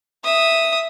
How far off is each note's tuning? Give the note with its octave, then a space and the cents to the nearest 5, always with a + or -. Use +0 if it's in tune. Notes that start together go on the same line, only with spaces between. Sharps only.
E5 +0 D#6 +0